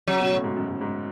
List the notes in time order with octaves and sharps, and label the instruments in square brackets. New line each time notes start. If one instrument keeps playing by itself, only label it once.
[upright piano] C#3 [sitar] F#3
[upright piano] B2
A2
G#2
F#2
G#2
G#2